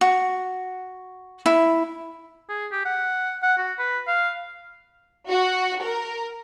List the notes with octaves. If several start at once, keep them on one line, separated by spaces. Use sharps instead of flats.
F#4
E4
G#4
G4
F#5
F#5
F#4
B4
F5
F#4
A#4